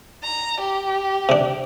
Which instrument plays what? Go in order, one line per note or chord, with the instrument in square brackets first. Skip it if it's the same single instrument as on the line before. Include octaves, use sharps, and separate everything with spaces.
[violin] A#5
G4
[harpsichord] C3 D4